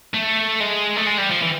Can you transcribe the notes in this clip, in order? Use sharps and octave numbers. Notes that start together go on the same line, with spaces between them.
A3
G#3
A3
G#3
G3
F3
E3